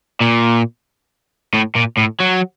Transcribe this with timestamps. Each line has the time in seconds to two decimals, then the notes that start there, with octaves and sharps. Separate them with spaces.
0.21 A#2
1.54 A2
1.75 A#2
1.97 A2
2.20 F#3